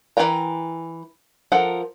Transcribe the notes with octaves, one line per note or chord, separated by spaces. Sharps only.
E3 F4 A#4 G5 A#5
F3 A4 A#4 F#5